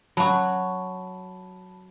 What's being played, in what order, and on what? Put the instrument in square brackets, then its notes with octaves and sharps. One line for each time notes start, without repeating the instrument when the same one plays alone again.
[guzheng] F#3 F#4 [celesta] A5 B5